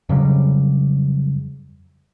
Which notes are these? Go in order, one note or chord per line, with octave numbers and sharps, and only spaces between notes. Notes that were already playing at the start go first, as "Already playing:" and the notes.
F2 C#3 F#3 G3